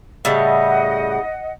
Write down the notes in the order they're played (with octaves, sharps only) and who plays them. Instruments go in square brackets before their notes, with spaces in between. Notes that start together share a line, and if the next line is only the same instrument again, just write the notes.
[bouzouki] A2 C#3 G3 [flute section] D#5 F#5